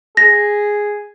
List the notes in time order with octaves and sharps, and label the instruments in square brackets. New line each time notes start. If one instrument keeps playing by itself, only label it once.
[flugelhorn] G#4 [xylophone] A#6